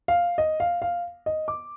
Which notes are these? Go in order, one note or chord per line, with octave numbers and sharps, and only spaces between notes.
F5
D#5
F5
F5
D#5
D6